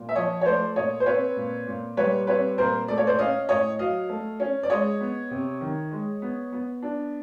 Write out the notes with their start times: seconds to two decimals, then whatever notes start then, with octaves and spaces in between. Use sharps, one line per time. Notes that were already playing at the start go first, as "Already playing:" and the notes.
Already playing: A#2
0.09 E5
0.15 F3 C#5 D#5
0.41 C#5
0.45 A3 C5 D5
0.76 A#2 C#5 D#5
1.00 C5
1.06 C4 B4 C#5
1.36 A#2
1.67 A#2
1.97 G3 B4 C#5
2.27 C4 B4 C#5
2.58 A#2 A#4 C5
2.88 A3 D5
2.98 C#5
3.07 C5 D5
3.19 C#4 D#5 F5
3.49 A2 C#5 D#5
3.79 F#3 D#5 F5
4.09 A3
4.40 C#4
4.63 D5
4.70 G#3 C#5 D#5
5.01 B3
5.31 C3
5.61 D#3
5.92 G#3
6.22 B3
6.52 B3
6.82 D4